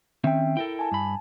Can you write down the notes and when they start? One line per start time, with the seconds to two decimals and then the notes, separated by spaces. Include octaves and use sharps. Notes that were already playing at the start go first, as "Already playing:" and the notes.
0.24 D#3 C4 C#4 E5 G5
0.57 E4 A4 A#4 G5
0.79 G#5 A5
0.92 G2 B5